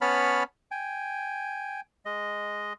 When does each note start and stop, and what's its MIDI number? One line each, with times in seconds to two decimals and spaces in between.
0.01 0.43 59
0.01 0.43 61
0.01 0.43 73
0.01 0.43 81
0.01 0.43 83
0.01 0.43 89
0.71 1.81 79
0.71 1.81 80
2.05 2.73 56
2.05 2.73 75